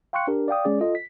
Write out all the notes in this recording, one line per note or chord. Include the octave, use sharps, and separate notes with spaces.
F5 G5 C6 C#6 F#6 C#7
D4 G4 A#4
D5 F5 G5 D#6
G#3 C#4 G#4 D5
F4 A4 D#5
B6